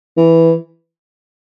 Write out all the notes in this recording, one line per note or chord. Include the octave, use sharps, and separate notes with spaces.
E3